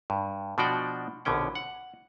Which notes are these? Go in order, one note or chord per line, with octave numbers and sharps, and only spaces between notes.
G2
B2 F3 D4 F#4 D5 G5
A#1 B2 D3 C#4 G5
F#5